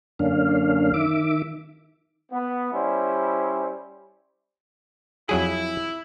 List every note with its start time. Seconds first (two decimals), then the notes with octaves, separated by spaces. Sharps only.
0.19 F#2 D3 A#3 C#4 D4 F5
0.94 D#3 E5 D6
2.32 B3
2.72 G3 C#4 E4 C5
5.29 F2 F#3 E4 G#4